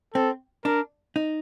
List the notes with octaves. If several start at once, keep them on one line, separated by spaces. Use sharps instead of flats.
C4 A4
D4 A#4
D#4